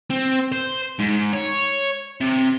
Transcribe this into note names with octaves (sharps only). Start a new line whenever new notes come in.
C4
C5
G#2
C#5
C3